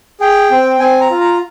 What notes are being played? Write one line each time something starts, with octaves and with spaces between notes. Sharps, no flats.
G#4 G5
C4
C4 G#5
A#5
F4
A#5